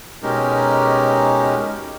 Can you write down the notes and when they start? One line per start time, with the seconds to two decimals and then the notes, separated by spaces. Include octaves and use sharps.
0.23 B2 G#3 C#4 D#4 G4 A#4